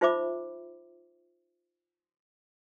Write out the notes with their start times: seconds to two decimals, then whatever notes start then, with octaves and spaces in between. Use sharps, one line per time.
0.01 D#4 F4 C5 E5 B5 D6